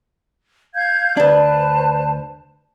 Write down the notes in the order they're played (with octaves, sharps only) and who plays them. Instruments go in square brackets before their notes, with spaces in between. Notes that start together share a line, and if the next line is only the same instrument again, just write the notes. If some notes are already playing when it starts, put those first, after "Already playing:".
[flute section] F5 G6 G#6
[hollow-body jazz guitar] D2 D4 [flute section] B4 C5 A5